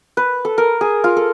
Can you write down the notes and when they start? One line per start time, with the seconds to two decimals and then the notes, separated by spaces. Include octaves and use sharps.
0.17 B4
0.45 A4
0.58 A#4
0.81 G#4
1.04 F4
1.17 A4